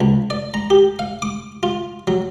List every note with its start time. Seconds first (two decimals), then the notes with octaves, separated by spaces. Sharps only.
0.01 C#2
0.30 D5
0.54 A#5
0.70 G4
0.99 F5
1.22 D6
1.63 F4
2.07 F#3